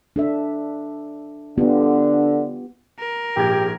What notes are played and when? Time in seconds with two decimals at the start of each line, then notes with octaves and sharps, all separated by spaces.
0.16 D4 A4 E5
1.58 D3 B3 F4 G4
2.99 A#4
3.36 A#1 G#2 G4 G#6